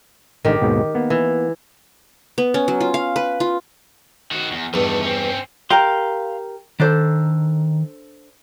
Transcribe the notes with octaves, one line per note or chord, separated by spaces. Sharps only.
A1 G#2 D3 D#3 G4
D#2 G#2 B2
A#3 B3
E3
B3
C#4
F#3
F4
F5
B4
F4
D#3 F#4
E2
E2 G2 D#3 A3
C4 C#4
G4 A#4 F5 A#5 C6
D#3 D4 A4 C5